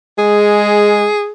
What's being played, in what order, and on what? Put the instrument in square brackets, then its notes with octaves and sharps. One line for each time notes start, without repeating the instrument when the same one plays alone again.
[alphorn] G#3 [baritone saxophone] G#4